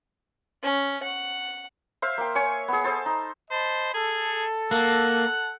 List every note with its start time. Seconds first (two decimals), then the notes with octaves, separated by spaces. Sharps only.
0.63 C#4
1.03 F#5
2.02 C5 E5 F5
2.18 A#3 G5
2.35 C#5 G#5 C#6
2.68 B3 G#4
2.84 A4 C5 A5
3.06 D#4
3.51 C5 D#5 A5 B5
3.94 G#4 A4
4.71 A#3 F#5